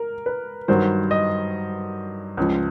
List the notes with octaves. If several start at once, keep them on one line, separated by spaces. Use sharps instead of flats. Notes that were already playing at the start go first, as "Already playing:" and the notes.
Already playing: A#4
B4
G2 D#3 F#3 C5
D#5
C#2 C#3 F3